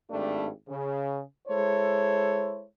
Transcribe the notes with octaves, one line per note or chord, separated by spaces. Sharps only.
G#1 G2 G3 A3 D4
C#3
G#3 E4 A4 C5 C#5